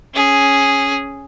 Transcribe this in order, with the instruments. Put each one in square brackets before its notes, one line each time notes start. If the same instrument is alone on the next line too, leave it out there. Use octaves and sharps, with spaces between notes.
[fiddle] C#4 G#4